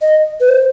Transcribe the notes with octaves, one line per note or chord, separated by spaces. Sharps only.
D#5
B4
C5